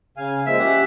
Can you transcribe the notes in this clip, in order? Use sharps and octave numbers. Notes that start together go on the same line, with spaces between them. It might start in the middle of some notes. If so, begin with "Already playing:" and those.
C#3 F5 G#5
F3 G#3 A#3 E5
C#4 G4 F#5